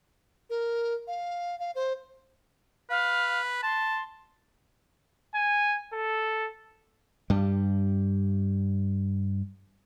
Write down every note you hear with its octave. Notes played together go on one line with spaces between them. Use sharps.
A#4
F5
F5
C5
B4 F5
A5 C6
G#5
A4
G2 G3